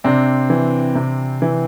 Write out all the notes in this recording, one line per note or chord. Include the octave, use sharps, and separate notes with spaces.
C3 C4 D4
E3
C3
E3